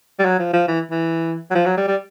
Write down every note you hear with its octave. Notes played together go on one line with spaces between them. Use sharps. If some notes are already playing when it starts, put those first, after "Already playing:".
G3
F#3
F3
F3
E3
E3
F#3
F3
F#3
G3
G3